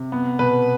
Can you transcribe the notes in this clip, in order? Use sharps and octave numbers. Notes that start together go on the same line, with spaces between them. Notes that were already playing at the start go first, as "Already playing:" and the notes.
Already playing: C3
B3
B2 B4